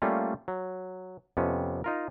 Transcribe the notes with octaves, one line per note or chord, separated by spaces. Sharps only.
G3 A3 A#3 C#4 F4
F#3
F2 C3 B3 C#4
D#4 F4 A#4